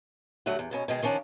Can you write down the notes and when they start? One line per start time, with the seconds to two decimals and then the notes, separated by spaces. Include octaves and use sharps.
0.46 D2 F#3 G3 A3 F#5
0.59 E2
0.71 G#2 B2 C#4
0.88 B2 D#3 G#3 G#4
1.03 D#3 F3 C#4 D4